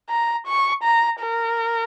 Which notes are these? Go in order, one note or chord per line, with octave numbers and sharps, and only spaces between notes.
A#5
C#6
A#5
A#4